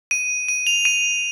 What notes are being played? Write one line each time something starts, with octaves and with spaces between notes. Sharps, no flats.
D#7
D#7
F7
D#7